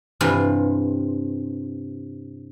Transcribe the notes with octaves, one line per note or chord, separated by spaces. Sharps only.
G2 C3 E3 F4